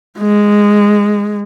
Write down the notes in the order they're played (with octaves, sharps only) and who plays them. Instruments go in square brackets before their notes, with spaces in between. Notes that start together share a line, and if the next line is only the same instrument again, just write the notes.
[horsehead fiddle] G#3